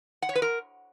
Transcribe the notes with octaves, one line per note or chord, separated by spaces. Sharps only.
F#5
C#5
B4
A#4